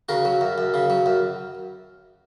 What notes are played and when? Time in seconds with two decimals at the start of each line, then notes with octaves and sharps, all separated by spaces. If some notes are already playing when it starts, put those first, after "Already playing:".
0.09 C#3 F#4 A#4
0.25 F#3
0.41 F#2
0.58 F#2
0.74 C#3
0.90 F#3
1.06 F#2